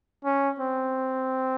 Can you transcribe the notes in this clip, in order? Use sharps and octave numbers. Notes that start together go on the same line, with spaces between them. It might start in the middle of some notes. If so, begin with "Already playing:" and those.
C#4
C4